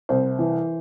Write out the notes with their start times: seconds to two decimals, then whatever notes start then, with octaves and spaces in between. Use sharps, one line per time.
0.09 C2 C5
0.39 E3